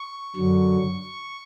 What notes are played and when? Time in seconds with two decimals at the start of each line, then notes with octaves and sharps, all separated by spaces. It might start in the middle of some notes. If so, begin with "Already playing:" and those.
Already playing: C#6
0.36 F#2 D3 F#3